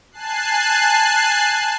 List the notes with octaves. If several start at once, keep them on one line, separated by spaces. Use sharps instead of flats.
G#5 A5 F#6 C7